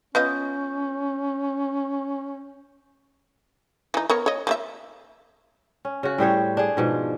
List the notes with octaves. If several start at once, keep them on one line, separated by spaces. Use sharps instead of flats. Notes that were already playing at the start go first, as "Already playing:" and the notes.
B3 C#4 F4 D#5 G6
E3 D#4
B3 A#4 C#5
C#5 D#5
F3 A#3 E5
C#4
C#3 F#4
A2 G3 C5 C#5
D4 G#4
G#2 B2 F3